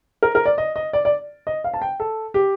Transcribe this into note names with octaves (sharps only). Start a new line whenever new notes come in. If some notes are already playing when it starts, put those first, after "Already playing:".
A#4
A#4
D5
D#5
D#5
D5
D5
D#5
F5
A5
G5
A4
G4